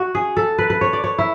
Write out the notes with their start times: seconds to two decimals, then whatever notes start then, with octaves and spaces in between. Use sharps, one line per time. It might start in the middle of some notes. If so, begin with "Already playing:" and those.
Already playing: F#4
0.15 G#4
0.37 A4
0.58 B4
0.70 B4
0.81 C#5
0.93 D5
1.04 C#5
1.18 E4